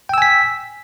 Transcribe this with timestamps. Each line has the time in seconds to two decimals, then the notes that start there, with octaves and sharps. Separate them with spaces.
0.09 G5
0.14 E6
0.18 G#5
0.22 B6